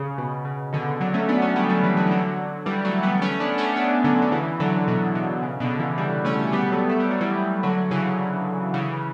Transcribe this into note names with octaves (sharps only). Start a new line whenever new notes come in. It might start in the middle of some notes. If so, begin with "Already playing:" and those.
Already playing: C#3
B2
C#3
B2 D3
D3 F#3
A3 C#4
B3 D4
A3 C#4
G3 B3
F#3 A3
E3 G3
D3 F#3
E3
D3 F#3
E3 G3
F#3 A3
G3 B3
A3 C#4
B3 D4
A3 C#4
B3 D4
D3 F#3
D3
C#3 E3
D3 F#3
B2 D3
B2
C#3
B2 D3
C#3 E3
E3 G3
A3 C#4
G3 B3
F#3 A3
A3
G3
F#3
E3 G3
D3 F#3
C#3 E3
C#3 E3